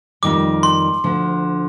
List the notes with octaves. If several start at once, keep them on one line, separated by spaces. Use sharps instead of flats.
F2 D#3 G3 A#3 F4 D6
C6
D2 D3 F3